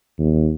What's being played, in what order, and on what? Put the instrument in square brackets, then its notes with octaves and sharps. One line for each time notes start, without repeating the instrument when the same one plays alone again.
[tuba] D#2